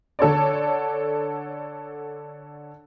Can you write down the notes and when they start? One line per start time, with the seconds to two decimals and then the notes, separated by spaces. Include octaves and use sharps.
0.19 D3 A4 C#5 D5